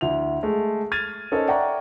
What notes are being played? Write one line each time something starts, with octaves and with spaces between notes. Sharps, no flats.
D2 E4 F7
G#3 A3
F6 G#6 A6 D#7 F7
C#4 D#4 A4 A#4 C5 D#5
D5 E5 F#5 G5 A#5 C#6